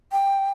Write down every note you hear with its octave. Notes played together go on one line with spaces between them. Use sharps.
G5